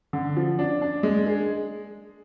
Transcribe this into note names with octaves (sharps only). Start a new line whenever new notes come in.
D3
F3
D4
D4
G#3
G#4